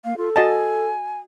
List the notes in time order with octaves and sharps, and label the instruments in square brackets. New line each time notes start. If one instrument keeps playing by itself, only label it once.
[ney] A#3 [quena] F5
[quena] F4 [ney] A4
[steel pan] F#4 D#5 A5 [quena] G#5